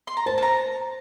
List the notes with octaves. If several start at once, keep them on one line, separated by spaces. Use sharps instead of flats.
C6
A#5
C5 A5
A5
A#5